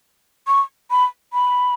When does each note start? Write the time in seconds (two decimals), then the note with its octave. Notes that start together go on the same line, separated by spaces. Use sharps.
0.47 C#6
0.91 B5
1.33 B5